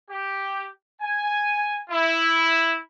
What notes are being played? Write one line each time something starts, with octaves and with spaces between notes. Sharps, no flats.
G4
G#5
E4